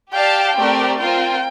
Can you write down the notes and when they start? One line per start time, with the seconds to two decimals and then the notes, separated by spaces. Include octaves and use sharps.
0.12 G4 D5 F5 G5 A5
0.56 A3 C4 G4 A#4 D5
0.99 C4 F4 A#4 G5